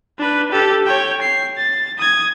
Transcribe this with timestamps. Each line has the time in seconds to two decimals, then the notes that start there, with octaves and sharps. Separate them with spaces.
0.18 D4 B4
0.52 G4 A4
0.86 C#5 G5
1.22 C7
1.58 A6
1.98 D#6 G#6